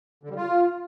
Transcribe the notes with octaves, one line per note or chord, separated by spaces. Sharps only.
D3
G3
F4